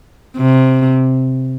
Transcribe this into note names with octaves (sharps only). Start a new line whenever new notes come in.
C3